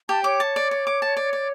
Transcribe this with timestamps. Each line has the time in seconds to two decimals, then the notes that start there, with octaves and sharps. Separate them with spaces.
0.09 G4 A5
0.24 C#5 D6
0.40 A5
0.56 D5
0.71 D5
0.87 D6
1.02 A5
1.17 D5
1.33 D5